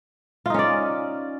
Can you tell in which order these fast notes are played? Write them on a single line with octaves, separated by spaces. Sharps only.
F4 D#4 C#4 D5